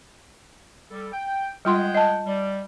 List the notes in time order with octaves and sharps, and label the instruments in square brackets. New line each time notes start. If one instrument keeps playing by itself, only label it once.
[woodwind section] G3 A4
G5
[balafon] G3 F4 C6 [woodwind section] G#3 F#5 G5
[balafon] D#5 A5
[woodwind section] G3